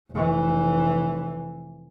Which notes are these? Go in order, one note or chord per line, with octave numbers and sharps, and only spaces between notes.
F1 E3